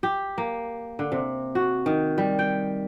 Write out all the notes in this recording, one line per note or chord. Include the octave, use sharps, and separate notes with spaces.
G4
A#3
D3
C3
F#4
D#3
G3
G5